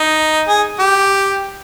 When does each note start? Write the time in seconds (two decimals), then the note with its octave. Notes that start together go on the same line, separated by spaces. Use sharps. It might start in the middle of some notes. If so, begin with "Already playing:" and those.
Already playing: D#4
0.48 G#4
0.79 G4